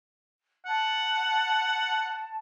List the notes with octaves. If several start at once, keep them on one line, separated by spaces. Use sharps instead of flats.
F#5 A5